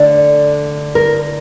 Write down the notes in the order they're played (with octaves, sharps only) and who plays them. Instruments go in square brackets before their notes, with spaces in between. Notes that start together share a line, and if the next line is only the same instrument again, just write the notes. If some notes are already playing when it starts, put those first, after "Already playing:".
Already playing: [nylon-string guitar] D3 A3 D4 D5
A#4